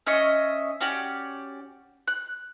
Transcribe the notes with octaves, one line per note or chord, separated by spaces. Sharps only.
C#4 D#5 E5 C#6
C#4 F#4 G4 D5
F#6